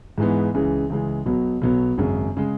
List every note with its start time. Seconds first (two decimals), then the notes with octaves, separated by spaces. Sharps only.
0.18 G#2 E3 G#3 B3
0.55 C#2 C#3 E3 G#3
0.90 C#2 C#3 E3 G#3
1.26 B1 B2 F#3 B3
1.62 B1 B2 F#3 B3
1.98 G#1 F#2 C#3 G#3
2.37 C#3 G#3